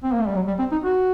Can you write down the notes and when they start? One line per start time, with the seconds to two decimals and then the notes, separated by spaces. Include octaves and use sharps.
0.04 C4
0.12 A#3
0.20 A3
0.28 G3
0.36 F#3
0.47 G3
0.59 C4
0.72 D#4
0.84 F#4